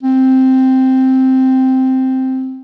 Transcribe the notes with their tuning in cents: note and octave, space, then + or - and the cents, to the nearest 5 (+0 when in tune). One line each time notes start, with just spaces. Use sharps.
C4 +0